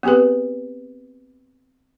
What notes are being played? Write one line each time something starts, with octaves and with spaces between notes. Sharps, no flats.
B3 C4 G4 G#4 B4